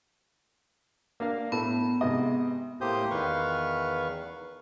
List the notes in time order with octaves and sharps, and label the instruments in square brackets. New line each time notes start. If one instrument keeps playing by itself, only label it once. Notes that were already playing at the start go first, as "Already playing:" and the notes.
[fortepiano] A#3 D4 F5
[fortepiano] A2 A4 [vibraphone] B3
[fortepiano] G#2 C3 D#5
[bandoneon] A2 A#3 G4 C5 D#6 G6
E2 D#3 B4 F5 C#6